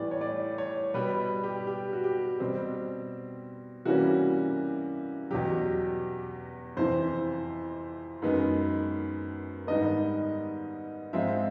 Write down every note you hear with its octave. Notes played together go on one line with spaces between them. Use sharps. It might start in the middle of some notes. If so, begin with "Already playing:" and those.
Already playing: A2 E3 G3 B3 D5
C#5
D5
C#5
B2 G3 B3 B4
G4
G4
F#4
G4
B2 G3 C4
C3 E3 G3 A#3 C#4 F#4
E2 B2 F#3 G4
F2 C3 E3 C5
F#2 D#3 G#3 B3
G#2 D#3 G3 B3 D#5
G#2 F3 G#3 C4 E5